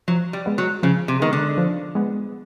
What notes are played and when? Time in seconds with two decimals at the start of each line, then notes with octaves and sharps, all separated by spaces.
0.08 F3 F#3
0.33 G3
0.46 G#3 B3
0.58 F#3
0.83 C#3 F3
1.08 C3
1.20 D#3 G#3 B3
1.33 D3
1.58 F3
1.95 G#3 B3